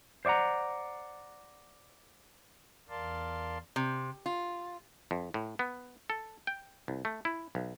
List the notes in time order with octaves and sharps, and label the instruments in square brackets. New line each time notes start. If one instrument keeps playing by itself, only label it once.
[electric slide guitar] C5 D5 E5 F#5 A#5
[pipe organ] E2 A#4 D5 F5 A5 C6
[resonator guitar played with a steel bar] C3
F4
[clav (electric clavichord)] F2
A2
B3
A4
G5
C2
A3
E4
B1